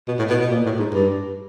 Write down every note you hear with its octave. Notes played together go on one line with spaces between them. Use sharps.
B2
A2
B2
B2
A#2
A2
G#2
G2